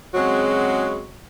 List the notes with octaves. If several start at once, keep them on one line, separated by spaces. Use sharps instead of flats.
C#3 F#3 G#3 C4 F#4